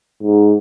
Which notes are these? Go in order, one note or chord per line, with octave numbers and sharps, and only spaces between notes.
G#2